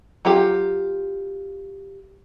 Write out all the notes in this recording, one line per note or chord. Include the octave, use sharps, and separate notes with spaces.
F#3 F4 G4